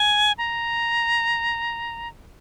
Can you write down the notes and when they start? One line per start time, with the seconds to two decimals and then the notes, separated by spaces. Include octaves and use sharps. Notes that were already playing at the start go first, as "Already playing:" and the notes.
Already playing: G#5
0.38 A#5